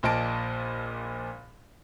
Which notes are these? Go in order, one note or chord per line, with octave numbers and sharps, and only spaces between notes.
A#1 A#2 D#5 A5 D7